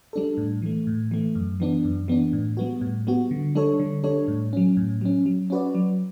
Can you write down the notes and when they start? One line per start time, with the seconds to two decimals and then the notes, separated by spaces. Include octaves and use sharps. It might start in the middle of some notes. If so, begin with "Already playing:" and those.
0.13 G3 D4 A4
0.37 A2
0.62 E3 A3
0.87 A2
1.11 E3 A3
1.35 F#2
1.60 E3 B3 D4
1.85 F#2
2.08 E3 B3 D4
2.33 A2
2.57 G3 B3 F#4
2.81 A2
3.07 G3 B3 F#4
3.31 D3
3.55 G3 D4 A4 C#5
3.80 D3
4.04 G3 D4 A4 C#5
4.28 A2
4.53 F#3 C#4
4.77 A2
5.01 F#3 C#4
5.26 F#3
5.50 C#4 F#4 B4 D5
5.75 F#3